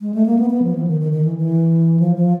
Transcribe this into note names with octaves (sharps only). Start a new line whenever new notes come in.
G#3
A3
A#3
B3
B3
F3
E3
D#3
D#3
D#3
E3
E3
F3
F3